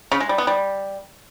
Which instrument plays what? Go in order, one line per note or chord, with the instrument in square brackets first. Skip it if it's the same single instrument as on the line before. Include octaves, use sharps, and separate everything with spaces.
[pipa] C#3
G#3
G3
B3
G3